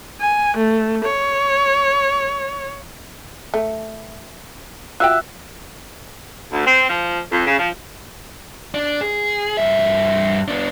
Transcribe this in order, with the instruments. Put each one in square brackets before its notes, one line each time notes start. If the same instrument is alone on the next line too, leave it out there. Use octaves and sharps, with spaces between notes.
[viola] G#5
A3
C#5
[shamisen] A3
[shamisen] F4 F#4 G5 [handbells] E5 E6 F#6
[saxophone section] D2
C4
F3
F2
C#3
F3
[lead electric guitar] D4
G#4
G2 E5
B3 D4